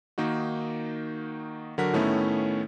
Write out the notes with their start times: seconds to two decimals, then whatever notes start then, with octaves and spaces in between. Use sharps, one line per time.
0.18 D#3 A#3 D#4 F#4
1.78 D3 F#3 F#4 A#4 F#5 B6
1.93 A2 D#3 A3 B3 C#4 E4